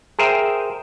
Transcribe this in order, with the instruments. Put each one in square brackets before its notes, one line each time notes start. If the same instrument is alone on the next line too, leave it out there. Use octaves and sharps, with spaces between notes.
[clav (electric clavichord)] G#4 A#4 C5 E5 G5